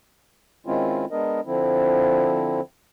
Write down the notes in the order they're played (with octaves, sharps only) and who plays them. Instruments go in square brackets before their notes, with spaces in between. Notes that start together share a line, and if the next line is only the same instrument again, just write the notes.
[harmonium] D#3 G#3 C4 C#4 E4 F4
G#3 B3 D4 A#4 D#5
D3 F3 C4 E4